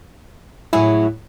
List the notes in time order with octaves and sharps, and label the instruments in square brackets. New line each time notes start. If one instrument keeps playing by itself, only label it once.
[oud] A2 F#3 G#4 [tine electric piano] E4